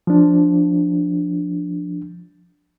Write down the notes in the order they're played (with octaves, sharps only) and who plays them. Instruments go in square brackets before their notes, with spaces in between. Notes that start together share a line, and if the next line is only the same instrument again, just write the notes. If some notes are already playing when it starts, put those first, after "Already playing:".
[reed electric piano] F3 D4